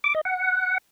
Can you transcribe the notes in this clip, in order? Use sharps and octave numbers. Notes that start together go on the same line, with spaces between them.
D6
D#5
F#5